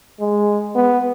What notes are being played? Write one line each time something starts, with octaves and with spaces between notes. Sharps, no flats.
G#3
B3